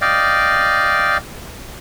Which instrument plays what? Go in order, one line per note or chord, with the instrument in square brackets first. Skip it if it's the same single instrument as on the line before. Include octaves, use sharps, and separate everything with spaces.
[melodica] D5 D#5 F5 G5